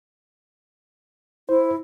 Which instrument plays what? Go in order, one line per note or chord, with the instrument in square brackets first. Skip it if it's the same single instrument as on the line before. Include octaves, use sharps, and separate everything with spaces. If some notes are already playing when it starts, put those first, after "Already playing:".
[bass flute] E4 [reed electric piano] C5